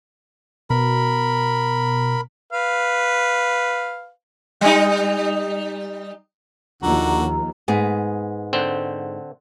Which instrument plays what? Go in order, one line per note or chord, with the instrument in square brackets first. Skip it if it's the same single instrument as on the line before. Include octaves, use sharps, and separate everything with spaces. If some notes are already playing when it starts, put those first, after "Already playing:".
[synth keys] B2 [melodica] A#4 B5
[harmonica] B4 F5
[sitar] G3 D#4
[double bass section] D#2 [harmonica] D3 F#4 [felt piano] F3 D#4 [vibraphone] A#5
[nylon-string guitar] G#2 B3 G#4
[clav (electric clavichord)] D3 C4